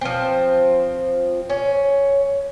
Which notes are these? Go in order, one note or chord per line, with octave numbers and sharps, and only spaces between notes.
F3 C4
C#4